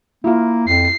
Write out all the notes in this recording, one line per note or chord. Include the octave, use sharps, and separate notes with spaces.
A#3 E4 F4
F2 C7